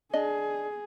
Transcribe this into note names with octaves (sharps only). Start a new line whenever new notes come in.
D4 G#4 D#5